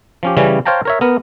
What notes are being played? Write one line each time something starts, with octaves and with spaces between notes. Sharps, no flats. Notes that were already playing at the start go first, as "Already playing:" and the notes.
F3 C#4 G4
C#3 E3 G3 C#4
C5 C#5 F5 G5 A5 A#5
A#4 C#5 E5
B3 A#4